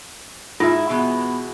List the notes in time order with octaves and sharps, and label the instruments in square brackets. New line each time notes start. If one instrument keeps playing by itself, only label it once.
[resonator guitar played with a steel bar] G#2 E4 [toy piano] F4
[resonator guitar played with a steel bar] B2 E3 G#3 [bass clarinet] B3